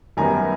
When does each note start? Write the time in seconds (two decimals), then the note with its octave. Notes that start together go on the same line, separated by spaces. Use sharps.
0.17 F#2 D#3 G3 B3 G#5 A#5